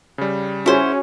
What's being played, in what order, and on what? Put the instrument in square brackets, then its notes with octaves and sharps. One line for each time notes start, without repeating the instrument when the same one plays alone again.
[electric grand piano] C#3 G3
[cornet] C#4 [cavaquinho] E4 C5 [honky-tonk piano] F#4 G#4 C#5